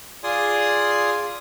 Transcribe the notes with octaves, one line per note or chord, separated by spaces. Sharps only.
F4 G#4 D5 G#5 C6 D#6